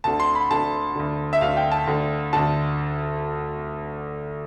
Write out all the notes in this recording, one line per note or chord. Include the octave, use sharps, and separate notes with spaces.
D2 D3 A5
C6
B5
D2 D3 A5
D2 D3
E5
D2 D3 F5
G5
A5
D2 D3
D2 D3 A5